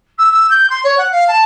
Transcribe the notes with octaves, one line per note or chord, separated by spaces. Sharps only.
E6
E6
G6
C6
C#5
F#5
F5
A5